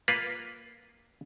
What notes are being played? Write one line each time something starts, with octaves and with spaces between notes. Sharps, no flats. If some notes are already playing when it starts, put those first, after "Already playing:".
A#3 F4 A#4 B4